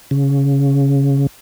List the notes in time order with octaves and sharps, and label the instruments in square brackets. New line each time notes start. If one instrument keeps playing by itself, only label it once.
[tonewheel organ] C#3